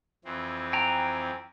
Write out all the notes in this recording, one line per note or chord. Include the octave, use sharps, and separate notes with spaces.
F2 E3 C4
G5 G#5 A#5